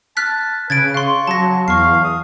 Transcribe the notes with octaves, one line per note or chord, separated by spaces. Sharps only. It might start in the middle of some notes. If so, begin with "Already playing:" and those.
A5 F6 F#6 B6
C#3 B4 G#6 A6 D7
F5 C6 C#6
F#3 A5 A#6
E2 F5 C#6 C7
D#6